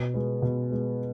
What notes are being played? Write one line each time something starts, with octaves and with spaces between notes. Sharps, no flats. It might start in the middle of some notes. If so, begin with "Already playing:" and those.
Already playing: B2
G#3 B3
B2
G#3 B3